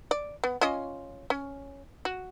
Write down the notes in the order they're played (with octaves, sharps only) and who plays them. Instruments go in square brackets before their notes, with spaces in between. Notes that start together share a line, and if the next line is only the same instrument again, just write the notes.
[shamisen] D5
B3
C#4 F4 D#5
C#4
F#4